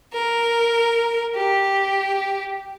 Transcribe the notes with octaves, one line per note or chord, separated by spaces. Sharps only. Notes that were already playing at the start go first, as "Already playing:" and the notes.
A#4
G4